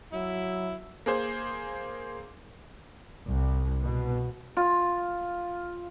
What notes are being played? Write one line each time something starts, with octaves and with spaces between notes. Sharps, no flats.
F#3 E4
A#3 G#4 C5
C2
B2
F4